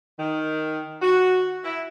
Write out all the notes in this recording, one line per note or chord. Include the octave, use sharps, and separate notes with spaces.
D#3
F#4
E4